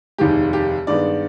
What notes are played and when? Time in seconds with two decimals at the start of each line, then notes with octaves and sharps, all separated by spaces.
0.18 F1 D#2 D#3 G#3 G4
0.53 G4
0.87 G2 D#3 G#3 B3 D5